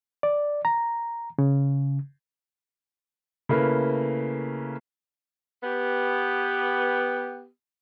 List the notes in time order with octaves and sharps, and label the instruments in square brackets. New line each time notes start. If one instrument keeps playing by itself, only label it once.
[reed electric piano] D5
A#5
C#3
[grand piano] C#3 A3 A#3 E4 A#4 B4
[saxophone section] B3 G4